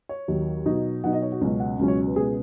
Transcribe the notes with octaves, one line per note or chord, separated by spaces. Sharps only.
C#5
D#2 D#3 F#3
B2 F#3 D#4
B2 F#3 D#4 F#5
D#5
C#5
F#4
C#2 B2 F#3 C#4
F#5
C#2 B2 F#3 C#4
C#5
B4
C#2 B2 B3 G#4